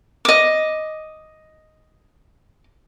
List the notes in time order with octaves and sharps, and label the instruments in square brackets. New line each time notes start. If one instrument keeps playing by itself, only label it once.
[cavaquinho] D#5 D6